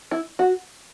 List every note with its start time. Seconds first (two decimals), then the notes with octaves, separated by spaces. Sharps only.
0.11 E4
0.39 F#4